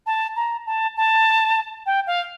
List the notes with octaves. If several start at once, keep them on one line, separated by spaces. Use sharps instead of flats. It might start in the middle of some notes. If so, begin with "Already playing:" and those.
A5
A#5
A5
A5
G5
F5